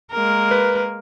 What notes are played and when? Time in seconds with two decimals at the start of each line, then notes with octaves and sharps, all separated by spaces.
0.12 G#3 A#3 A#4
0.51 B4